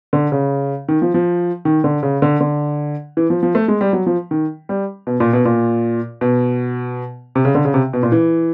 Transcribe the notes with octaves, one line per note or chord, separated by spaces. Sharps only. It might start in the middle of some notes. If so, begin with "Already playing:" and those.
D3
C#3
D#3
F3
F3
D#3
D3
C#3
D3
D3
E3
F3
F3
A3
G#3
G3
F#3
F3
D#3
G3
B2
A#2
B2
A#2
B2
C3
C#3
D3
C#3
C3
B2
A#2
E3